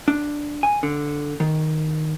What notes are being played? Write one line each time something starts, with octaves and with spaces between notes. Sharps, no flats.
D4
G#5
D3
D#3